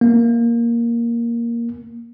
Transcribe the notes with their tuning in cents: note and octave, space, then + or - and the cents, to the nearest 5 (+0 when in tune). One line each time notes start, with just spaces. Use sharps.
A#3 +5